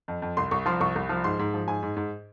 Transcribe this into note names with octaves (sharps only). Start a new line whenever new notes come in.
F2
F2
C2 C6
C2 C#6
F3 C6
C2 C#6
C2
F3
G#2 C6
G#2
F3
G#2 G#5
G#2
G#2